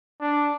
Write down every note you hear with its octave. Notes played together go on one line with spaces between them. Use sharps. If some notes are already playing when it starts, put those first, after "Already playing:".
D4